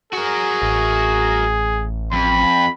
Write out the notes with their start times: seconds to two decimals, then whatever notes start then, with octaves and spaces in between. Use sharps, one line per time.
0.13 F#4 G#4 A#4
0.62 A1
2.13 F2 B5